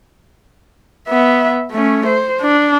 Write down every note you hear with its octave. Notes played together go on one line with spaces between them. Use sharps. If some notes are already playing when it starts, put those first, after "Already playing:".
B3 E5
A3 C#4
C5
D4